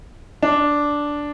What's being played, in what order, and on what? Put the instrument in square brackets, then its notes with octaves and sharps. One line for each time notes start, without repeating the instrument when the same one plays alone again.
[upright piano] D4